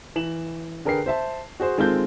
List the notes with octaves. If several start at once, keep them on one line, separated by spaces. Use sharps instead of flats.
E3 E7 F#7
D3 G#4 A#4 B4 G5 C7
C5 E5 A5
F#4 G#4 C5
D#3 G#3 C4 F4 A4 G6